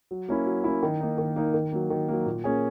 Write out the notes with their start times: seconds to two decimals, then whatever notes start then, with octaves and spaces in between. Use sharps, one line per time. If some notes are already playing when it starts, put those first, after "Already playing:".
0.11 F#3
0.28 A#3 C#4 E4
0.46 F#3
0.64 A#3 C#4 E4
0.83 D#3
1.01 A#3 D#4
1.18 D#3
1.36 A#3 D#4
1.54 D#3
1.72 F#3 A#3
1.90 D#3
2.08 F#3 A#3
2.26 A#2
2.44 A#3 C#4 G#4